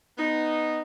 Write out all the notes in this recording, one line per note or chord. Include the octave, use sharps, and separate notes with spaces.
B3 D#4